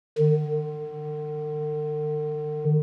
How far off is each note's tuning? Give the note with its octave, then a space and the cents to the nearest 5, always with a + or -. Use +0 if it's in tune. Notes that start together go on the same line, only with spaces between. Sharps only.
D3 +45